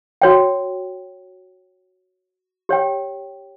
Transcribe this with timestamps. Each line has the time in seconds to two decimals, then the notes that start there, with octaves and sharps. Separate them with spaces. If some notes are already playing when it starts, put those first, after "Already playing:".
0.22 F#4 C#5 G5
2.69 G4 C#5 G5